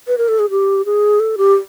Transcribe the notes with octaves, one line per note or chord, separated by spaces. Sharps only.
B4
A#4
A4
G#4
G4
G#4
A4
G4